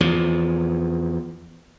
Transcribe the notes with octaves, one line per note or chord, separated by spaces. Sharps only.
E2 F3